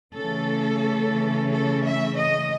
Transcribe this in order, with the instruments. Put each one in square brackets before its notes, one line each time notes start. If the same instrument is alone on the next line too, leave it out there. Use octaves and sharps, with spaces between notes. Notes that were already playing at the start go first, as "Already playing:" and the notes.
[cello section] C#3 E3 A3 C#4 A4
A4
E5
D#5